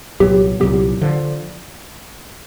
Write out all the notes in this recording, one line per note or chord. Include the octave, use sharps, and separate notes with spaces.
C2 A#2 F#3 B3 G4
C2 A#2 F#3 B3 G4
D3 F3